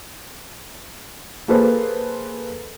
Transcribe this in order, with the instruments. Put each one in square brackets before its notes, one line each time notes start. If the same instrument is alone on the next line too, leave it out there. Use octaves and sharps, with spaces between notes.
[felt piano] A#3 G#4 A4 B4 C5